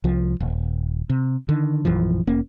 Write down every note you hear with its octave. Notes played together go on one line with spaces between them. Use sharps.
C2 F3
D#1
C3
D3 D#3
A#1 F#2 E3 F3
F1 A#3 C#4